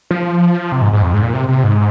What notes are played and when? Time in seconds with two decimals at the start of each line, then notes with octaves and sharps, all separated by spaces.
0.11 F3
0.72 C3
0.82 G#2
0.93 G#2
1.02 F2
1.14 G#2
1.23 A#2
1.34 C3
1.48 C3
1.64 G#2